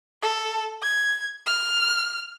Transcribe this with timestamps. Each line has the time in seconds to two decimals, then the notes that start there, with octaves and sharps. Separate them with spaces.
0.22 A4
0.82 G#6
1.46 F6